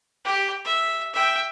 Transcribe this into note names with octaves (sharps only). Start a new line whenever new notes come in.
G4
E5
E5 G5